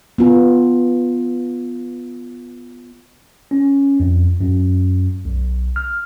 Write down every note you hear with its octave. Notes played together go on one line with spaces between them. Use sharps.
B3 F4
C#4
F2
F#2
B1
F6